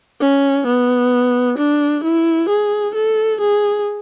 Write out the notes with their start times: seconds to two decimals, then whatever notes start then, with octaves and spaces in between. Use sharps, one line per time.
0.21 C#4
0.67 B3
1.58 D4
2.04 E4
2.49 G#4
2.95 A4
3.41 G#4